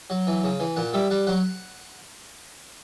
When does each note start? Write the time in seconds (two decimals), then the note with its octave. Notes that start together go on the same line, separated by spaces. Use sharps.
0.10 F#3
0.27 E3
0.44 C#3
0.60 E3
0.77 A#2 F#5
0.93 G3 E5
1.10 G3 F#5
1.27 F#3 F#5